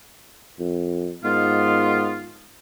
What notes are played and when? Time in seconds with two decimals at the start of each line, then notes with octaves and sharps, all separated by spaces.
0.60 F2
1.24 G#2 D#3 B3 F4